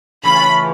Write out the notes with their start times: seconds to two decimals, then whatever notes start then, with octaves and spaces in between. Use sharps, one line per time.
0.23 C#3 E3 A3 C#4 F4 B5